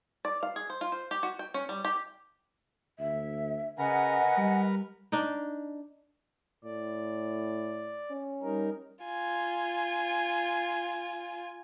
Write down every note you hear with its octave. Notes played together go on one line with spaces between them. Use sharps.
D5
F5
G#4
C5
F4
C5
G4
F#4
G5
C#4
G3
G4
D2 E5
C#3 A#4 B4 D#5 F#5 G#5 A#5
G3
D4 D#4
A2 D5
C#4
G3 D#4 A#4
F4 G#5